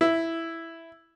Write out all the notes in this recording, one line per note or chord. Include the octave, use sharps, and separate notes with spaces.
E4